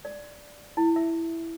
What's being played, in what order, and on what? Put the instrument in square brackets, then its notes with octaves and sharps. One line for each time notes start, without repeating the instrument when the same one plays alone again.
[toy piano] D5
E4
E5